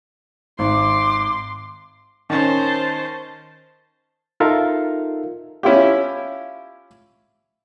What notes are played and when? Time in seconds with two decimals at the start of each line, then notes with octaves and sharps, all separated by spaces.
0.59 G#1 C6 D6
2.30 D#3 C#4 C5 A5
4.40 D#4 F4 A4 A#4 E5 F5
5.63 C#4 E4 F4 G4